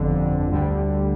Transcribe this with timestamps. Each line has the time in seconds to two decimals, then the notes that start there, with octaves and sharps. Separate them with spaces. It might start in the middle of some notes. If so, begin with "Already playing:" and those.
Already playing: G1 F2 D3
0.50 D2 D3 G3